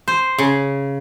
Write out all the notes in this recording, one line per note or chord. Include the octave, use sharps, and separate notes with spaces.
C5
C#3